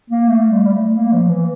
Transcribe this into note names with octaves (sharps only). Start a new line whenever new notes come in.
A#3
A3
G3
G3
A3
A#3
F3
E3